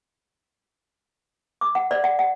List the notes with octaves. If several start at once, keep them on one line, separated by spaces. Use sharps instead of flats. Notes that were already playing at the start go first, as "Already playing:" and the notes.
D6
F#5
D5
F#5
F#5